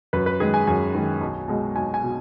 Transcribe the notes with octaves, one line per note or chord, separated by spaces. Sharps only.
F#2 B4
B4
D#3 G#3 G#4
G#5
F#2 G#5
D#3 G#3
B1
B2 G#3
B1 G#5
G#5
B2